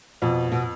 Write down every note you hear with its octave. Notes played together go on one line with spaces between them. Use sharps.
F2 B2
B2